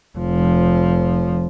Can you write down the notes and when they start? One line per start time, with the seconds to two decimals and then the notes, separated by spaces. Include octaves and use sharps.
0.17 F1 F3